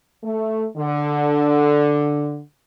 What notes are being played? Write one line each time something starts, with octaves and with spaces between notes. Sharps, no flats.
A3
D3